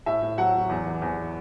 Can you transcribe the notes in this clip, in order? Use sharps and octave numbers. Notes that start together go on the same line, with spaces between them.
A2 E5
A2
F#3 F#5
F#3
E2
E3
E2